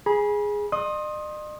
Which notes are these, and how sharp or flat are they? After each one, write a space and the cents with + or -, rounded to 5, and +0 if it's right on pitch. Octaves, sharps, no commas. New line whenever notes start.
G#4 -5 B5 -40
D#5 -45 C6 +30 D#6 +0